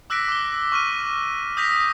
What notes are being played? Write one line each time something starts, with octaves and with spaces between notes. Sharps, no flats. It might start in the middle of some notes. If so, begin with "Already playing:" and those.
D6 E6 F#6 A#6 B6 D7
D6 G7
C#6 F6 D#7
D#6 G6 A#6 B6 F7